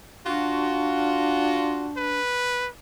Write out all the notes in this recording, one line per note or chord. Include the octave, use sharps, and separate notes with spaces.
D4 F4 F#4
B4